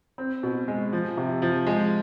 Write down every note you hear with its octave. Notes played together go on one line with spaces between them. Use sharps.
C4
B2
G#3
F3
C3
F3
G#3